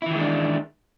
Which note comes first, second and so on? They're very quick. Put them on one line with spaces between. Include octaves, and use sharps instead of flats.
E4 E3 D#3 G#3 D4